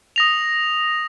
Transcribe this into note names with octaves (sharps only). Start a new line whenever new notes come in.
D#6 A#6 F7